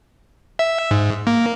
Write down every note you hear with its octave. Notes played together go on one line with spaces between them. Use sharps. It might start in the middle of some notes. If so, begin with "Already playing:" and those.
E5
G#2
A#3